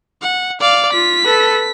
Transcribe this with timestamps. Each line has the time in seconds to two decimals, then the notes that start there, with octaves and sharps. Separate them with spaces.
0.22 F#5
0.60 D5 F5
0.93 F4 B6
1.24 A4 B4